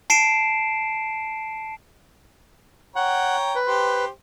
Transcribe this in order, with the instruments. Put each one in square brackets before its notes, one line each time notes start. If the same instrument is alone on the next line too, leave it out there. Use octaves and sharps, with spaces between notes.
[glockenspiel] A5 C7 D7 E7
[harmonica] C#5 G5 A#5 [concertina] F#5
[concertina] B4
[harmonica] G4 C5